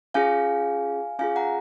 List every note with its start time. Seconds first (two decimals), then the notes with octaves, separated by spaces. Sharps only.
0.14 C#4 F4 G#4 F5 G#5
1.19 C#4 F4 G#4 F5 G#5
1.36 F#5 A#5